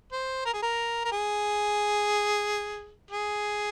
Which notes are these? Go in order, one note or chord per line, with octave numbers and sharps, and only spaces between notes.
C5
A#4
G#4
A#4
A#4
G#4
G#4